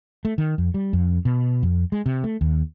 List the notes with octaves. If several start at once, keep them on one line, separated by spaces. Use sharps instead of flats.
A3
D#3
F2
G3
F2
B2
F2
G#3
C3
A3
D#2